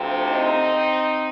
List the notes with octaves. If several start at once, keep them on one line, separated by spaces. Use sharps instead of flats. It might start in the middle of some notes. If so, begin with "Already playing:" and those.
Already playing: D2 C3 F3
C4 D#4